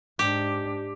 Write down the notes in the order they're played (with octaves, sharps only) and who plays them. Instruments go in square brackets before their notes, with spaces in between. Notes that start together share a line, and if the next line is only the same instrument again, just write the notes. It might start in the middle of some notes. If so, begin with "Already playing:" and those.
[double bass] G#2 D4 [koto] G4